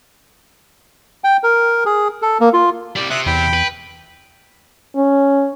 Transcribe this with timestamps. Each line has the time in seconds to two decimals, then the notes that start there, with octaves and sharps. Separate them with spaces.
1.24 G5
1.43 A#4
1.86 G#4
2.22 A4
2.40 A#3
2.53 F4
2.96 C2 G3 D5
3.10 C3 E5 D#6 F#6
3.26 E2 G5 B5
3.54 B4
4.96 C#4